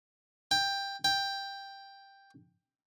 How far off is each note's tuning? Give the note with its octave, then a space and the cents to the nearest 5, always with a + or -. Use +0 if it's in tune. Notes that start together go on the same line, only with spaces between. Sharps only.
G5 +15
G5 +10